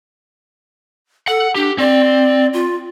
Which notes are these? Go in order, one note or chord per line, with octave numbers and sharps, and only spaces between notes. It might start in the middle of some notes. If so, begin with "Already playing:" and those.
A4 F#5
D4 G4
C4 D5
F4